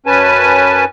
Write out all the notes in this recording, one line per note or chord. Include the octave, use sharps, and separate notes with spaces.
F#2 C#4 B4 G#5 A5